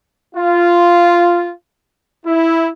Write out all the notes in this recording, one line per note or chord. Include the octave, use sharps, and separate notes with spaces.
F4
E4